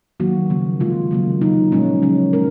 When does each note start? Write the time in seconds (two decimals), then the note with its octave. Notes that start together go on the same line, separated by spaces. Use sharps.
0.20 D#3 F#3 A#3 F#4
0.50 C#3 F3 A#3
0.80 C3 D#3 G#3 F4
1.11 C#3 F#3 A#3
1.41 C#3 F#3 A#3 D#4
1.72 A#2 F3 G#3 C#4
2.02 C#3 F#3 A#3 C#4
2.33 A#2 F3 G#3 A#4